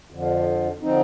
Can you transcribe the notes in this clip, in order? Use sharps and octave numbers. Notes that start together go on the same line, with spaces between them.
F2 D3 F3
D3 F3 C4 D#4